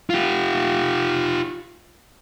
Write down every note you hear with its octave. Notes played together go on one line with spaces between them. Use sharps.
F4 G4